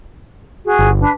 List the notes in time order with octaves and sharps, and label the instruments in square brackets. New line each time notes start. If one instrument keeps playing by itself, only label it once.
[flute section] F#4 G#4
[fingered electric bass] G1
[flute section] D4 B4